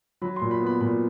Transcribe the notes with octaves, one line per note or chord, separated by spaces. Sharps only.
F#3 B5
A#2 C6
B5
B3
B5
A#2 B5